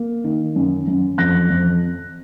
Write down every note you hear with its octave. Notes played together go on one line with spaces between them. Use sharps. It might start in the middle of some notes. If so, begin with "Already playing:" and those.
Already playing: A#3
D#3
F#2
F#2
F2 F#6 A#6
F2